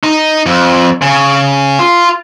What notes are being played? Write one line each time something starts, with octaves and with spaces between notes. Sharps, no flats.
D#4
F2
C#3
F4